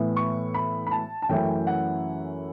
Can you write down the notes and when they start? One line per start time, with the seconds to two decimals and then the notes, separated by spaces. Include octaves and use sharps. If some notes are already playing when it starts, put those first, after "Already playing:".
Already playing: A2 E3 B3 E4
0.16 C#6
0.54 B5
0.87 B5
0.91 A5
1.22 A5
1.29 F#2 E3 A3 C#4 E4 G5
1.67 F#5